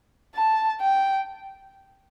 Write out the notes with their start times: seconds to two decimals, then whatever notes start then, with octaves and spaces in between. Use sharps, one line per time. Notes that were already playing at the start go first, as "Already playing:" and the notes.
0.35 A5
0.81 G5